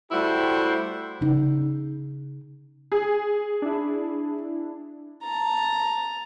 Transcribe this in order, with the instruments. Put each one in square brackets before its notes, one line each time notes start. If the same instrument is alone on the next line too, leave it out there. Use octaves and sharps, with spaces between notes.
[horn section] G3 A3 E4 F#4 G4 C5
[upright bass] C#3 D#4
[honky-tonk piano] G#4
[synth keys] D4 E4
[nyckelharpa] A5 A#5